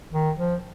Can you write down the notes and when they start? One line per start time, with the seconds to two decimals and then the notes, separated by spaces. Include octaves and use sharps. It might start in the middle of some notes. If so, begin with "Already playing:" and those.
0.13 D#3
0.38 F3